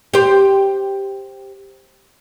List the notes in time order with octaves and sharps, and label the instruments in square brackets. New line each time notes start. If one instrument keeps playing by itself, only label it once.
[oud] G4 C5